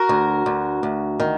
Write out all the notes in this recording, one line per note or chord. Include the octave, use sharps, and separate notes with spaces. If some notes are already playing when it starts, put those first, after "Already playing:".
Already playing: F#4 A#4
D2
D2
D2
D#3